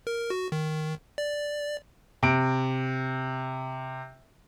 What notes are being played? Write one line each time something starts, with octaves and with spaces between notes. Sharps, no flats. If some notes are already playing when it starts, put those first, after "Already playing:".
A#4
F#4
D#3
D5
C3 D7